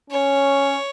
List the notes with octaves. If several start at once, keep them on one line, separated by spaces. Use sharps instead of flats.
C#4 C#5